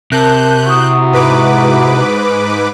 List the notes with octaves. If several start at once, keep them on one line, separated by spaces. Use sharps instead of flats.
C3 A#4 A5 F#6 G6
E4 F#4 A#5 C#6 D#6
G#2 B4 D6